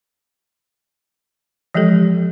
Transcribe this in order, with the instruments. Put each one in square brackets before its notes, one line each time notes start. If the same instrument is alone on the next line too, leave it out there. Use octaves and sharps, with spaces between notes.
[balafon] E3 F3 G#3 G4 A4